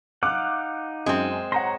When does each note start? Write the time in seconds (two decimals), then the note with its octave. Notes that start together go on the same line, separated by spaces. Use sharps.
0.23 D#4 F5 F#5 D6 F#6
1.06 F#2 G#3 C4
1.52 C#5 F#5 A#5 C6 A#6